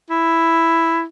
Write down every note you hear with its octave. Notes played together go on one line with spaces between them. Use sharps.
E4